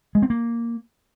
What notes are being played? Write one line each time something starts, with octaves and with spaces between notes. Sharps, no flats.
G#3
C4
A#3